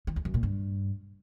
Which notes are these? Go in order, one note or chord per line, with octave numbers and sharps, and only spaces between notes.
D#3
E2
F#2
A#2
G2